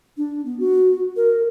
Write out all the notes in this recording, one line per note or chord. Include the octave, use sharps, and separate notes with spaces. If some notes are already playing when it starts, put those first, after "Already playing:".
D4
B3
F#4
A#4